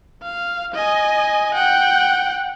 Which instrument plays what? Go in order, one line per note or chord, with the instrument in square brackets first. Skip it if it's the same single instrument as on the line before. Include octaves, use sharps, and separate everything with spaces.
[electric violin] F5
D#5 G#5
F#5 G5